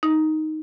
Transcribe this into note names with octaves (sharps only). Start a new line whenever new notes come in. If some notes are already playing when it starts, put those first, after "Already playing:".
D#4